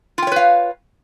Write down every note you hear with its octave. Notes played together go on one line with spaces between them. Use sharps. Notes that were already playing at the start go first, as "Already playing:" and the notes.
F4 B4 C#5 F5 G5